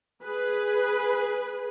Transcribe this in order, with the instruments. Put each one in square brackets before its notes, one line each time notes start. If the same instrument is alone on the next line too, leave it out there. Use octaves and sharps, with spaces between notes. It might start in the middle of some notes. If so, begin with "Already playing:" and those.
[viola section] G#4 B4